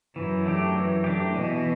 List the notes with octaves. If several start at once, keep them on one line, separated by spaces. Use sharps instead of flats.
F#2 E3
A3 D4 G4
E3
A3 D4 G4
B2 E3